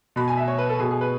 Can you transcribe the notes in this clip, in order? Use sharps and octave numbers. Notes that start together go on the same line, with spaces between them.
B2 B5
G#5
E5
C#5
B4
A4
B2 G#4
G#4
B4